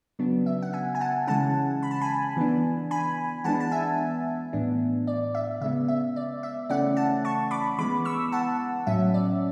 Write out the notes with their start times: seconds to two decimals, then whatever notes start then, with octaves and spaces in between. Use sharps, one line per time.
0.19 C#3 F#3 B3 D4
0.46 E5
0.62 F#5
0.73 E5 G#5
0.95 G#5
1.01 F#5 A5
1.27 C#3 E3 G#3 C#4 F#5 A5
1.83 B5
1.91 A5
2.01 G#5 B5
2.37 E3 B3 D4
2.91 G#5 B5
3.44 E3 G#3 B3 D4 F#5 A5
3.60 A5
3.71 E5 G#5
4.53 A2 E3 B3 D4
5.07 D5
5.35 E5
5.61 C#3 G#3 B3 E5
5.88 E5
6.16 D5
6.43 E5
6.69 C#3 E3 A3 C#4 D5 F#5
6.97 F#5 A5
7.25 A5 C#6
7.51 B5 D6
7.79 E3 G#3 B3 B5 D6
8.05 C#6 E6
8.32 F#5 A5
8.87 A2 F#3 C#4 E5
9.14 D5